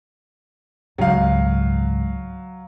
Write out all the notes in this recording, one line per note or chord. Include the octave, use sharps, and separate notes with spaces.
C#2 G#2 F#3 F5